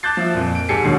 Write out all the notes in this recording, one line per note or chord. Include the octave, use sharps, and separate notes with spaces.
A5 D6 F#6 G6 A6 C7
F3 E5
F2 A#2
D7
G#2 G4 A4 G#5 C7 C#7
D#2 G#2 B2 D3 F#3